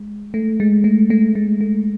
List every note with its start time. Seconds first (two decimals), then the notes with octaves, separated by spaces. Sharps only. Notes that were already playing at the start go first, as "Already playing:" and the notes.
Already playing: G#3
0.34 A3
0.60 G#3
0.84 A3
1.10 A3
1.35 G#3
1.61 A3